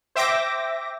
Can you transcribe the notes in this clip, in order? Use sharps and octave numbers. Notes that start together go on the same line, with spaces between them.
C5 E5 G5 D6 A#6